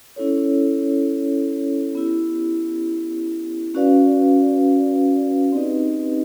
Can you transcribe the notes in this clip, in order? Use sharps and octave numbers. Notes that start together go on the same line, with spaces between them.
C#4 E4 A4 C#5
B3 E4 G4
C#4 F#4 B4 D5 F5
C4 D#4 G4 B4 D#5